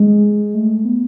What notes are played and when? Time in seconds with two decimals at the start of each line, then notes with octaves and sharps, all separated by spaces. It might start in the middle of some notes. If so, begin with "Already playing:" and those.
Already playing: G#3
0.54 A3
0.85 B3